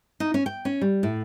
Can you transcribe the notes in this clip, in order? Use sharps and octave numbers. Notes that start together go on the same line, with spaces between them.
D#4
C#4
G5
C#4
G3
A2